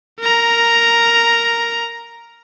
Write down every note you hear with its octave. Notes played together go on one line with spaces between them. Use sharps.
A#4 A#5